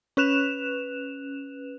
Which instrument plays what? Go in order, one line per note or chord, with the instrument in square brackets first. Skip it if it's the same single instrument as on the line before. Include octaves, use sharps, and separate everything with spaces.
[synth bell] C#4 B4 F#6 E7 F7